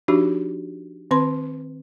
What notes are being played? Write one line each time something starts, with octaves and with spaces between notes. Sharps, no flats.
F3 D4 D#4 F#4 G4
D#3 C4 B4 C6